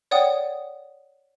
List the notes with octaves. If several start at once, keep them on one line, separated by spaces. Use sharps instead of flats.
C#5 D5 F#5 G5 D#6